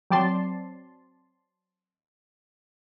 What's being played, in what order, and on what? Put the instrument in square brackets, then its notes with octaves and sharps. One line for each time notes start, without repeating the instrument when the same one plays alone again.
[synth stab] F#3 C4 D5 A5 C6